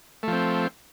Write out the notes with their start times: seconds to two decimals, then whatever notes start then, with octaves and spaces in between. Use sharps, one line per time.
0.23 A3
0.28 F3
0.32 C4